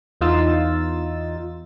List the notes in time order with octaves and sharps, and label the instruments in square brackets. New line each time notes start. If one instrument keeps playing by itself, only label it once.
[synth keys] E2 D#4 F4 E6 A6